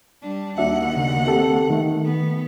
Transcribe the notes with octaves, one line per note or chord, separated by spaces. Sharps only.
G3 D4
D#2 D4 F#4 E5 F#5
C#3
C4 G4 A4
D#3 A3
B3